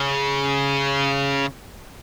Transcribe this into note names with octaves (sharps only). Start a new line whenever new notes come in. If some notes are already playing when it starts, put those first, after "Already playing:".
Already playing: C#3